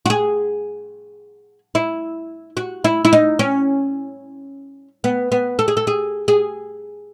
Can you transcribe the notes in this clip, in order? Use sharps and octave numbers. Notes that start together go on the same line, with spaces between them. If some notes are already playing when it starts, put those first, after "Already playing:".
F#4
G#4
E4
F#4
E4
E4
D#4
C#4
B3
B3
A4
G#4
A4
G#4
G#4